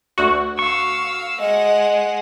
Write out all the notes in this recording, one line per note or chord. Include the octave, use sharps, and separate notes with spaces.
D2 F#4
F5 C#6 E6
G#3 D#5 F#5